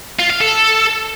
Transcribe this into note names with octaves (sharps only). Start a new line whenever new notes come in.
F4
F5
A4